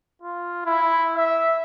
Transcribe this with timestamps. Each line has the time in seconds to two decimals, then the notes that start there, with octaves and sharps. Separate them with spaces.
0.22 F4
0.66 E4
1.16 E5